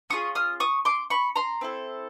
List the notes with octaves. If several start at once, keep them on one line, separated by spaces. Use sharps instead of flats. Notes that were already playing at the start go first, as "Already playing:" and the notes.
C#4 F4 G#4 C#6 D#6
D#6 F6
C#6 D#6
C6 D6
B5 C#6
A#5 C6
C4 E4 A4